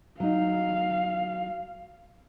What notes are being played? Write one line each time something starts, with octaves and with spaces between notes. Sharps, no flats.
F#3 D#4 F5